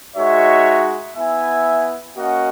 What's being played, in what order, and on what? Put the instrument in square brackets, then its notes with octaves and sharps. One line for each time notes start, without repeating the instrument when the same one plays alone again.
[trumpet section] G#3 D#4 F#4 C#5 E5
B3 E4 E5 G#5
A#3 C#4 F#4 D#5 F#5